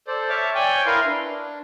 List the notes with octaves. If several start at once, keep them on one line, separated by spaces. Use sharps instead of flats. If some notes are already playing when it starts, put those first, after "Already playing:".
A4 C5 D5
C#5 E5 A5 D6 F6
C#5 D5 G5 G#5
E4 A#4 B4 F5 C6
D4